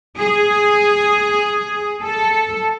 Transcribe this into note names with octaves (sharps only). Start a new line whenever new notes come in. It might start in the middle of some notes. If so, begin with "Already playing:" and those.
G#4
A4